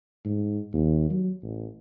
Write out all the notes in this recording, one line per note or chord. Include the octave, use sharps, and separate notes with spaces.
G#2
D#2
F#3
A1